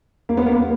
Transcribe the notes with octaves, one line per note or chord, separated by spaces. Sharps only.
A#3
B3
A#3